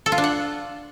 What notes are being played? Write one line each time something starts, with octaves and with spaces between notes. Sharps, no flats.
A4
F4
D4
F#5